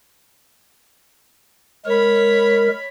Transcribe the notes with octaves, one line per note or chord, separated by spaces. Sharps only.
G#3 A#4 C#5 B5